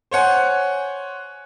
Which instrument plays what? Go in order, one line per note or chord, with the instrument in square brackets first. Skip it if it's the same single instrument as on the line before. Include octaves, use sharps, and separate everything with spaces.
[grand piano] C5 C#5 F#5 G#5